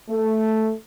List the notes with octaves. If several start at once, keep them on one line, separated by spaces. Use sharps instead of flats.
A3